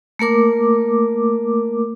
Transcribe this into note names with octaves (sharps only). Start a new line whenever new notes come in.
A3 A#3 A#4 D6